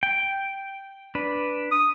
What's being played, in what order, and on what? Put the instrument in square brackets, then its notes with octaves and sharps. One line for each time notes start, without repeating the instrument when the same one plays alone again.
[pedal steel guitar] G5
D4 B4
[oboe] D#6